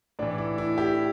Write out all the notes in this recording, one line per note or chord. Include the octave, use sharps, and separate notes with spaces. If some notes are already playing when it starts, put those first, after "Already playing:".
A2 E3 D4
E4
E4
G4